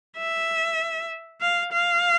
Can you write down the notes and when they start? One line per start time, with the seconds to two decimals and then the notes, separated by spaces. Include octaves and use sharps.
0.17 E5
1.41 F5
1.72 F5